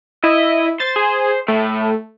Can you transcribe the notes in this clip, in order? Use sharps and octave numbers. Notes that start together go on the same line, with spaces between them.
E4 D#5
C5 A6
G#4
A2 A3